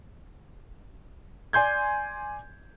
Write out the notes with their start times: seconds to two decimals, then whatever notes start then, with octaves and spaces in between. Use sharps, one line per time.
1.53 D5 G#5 C6 G6 G#6